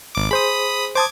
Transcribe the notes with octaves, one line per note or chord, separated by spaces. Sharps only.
G#1 D6
G#4 C5 B5 D#6
C5 A5 D6 D#6 G#6